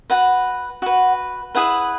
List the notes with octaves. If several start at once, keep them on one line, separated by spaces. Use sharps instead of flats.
F#4 B4 F#5
F#4 B4
E4 G#4 B4 F#5